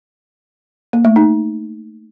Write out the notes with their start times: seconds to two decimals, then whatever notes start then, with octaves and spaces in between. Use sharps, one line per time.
0.93 A#3
1.05 A3
1.16 D#4